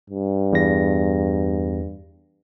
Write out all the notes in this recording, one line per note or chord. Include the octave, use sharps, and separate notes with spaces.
G2
E2 A#6